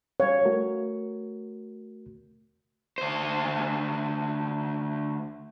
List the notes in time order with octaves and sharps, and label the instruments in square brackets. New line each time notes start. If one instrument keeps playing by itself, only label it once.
[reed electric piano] G3 F5 [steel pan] C#5
[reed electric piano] A3 F#4 A#4
[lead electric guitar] D2 C5